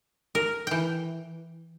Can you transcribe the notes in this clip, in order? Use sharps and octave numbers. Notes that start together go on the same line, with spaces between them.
A#4
E3 G5